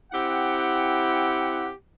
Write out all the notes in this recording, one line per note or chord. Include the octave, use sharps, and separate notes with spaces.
C4 E4 G4 F#5